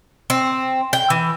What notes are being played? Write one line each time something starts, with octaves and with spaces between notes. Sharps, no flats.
C4
G5
E3